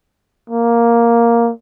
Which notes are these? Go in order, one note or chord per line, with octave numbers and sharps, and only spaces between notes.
A#3